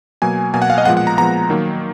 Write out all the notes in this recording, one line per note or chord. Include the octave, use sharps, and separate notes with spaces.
B2 F#3 A#3 G#5
B2 F#3 A#3 G#5
F#5
F5
D#5
A#2 F3 G#3 B3 F#5
F#5
A#5
A#2 F3 G#3 B3 A#5
D#3 F#3 A#3